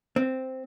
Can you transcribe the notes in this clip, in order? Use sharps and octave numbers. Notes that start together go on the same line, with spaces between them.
C4